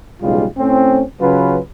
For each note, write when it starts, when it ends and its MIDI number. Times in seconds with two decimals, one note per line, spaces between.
0.22 0.45 35
0.22 0.45 45
0.22 0.45 49
0.22 0.45 55
0.22 0.45 56
0.22 0.45 65
0.57 1.02 45
0.57 1.02 60
0.57 1.02 61
1.20 1.58 49
1.20 1.58 54
1.20 1.58 61
1.20 1.58 65
1.20 1.58 71